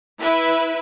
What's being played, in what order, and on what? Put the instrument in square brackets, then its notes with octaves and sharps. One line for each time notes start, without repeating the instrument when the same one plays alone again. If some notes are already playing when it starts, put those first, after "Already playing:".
[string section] E4 B4 E5